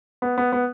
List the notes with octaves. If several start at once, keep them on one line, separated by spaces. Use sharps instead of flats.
B3
B3
B3